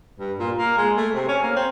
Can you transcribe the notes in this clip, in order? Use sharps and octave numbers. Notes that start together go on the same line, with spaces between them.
G2
A#2
A#3
G#3
A3
C3
C#4
A#3
C4